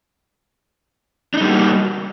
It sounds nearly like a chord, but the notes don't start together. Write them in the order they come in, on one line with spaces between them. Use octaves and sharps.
D4 D#4 G3 A#3 F#4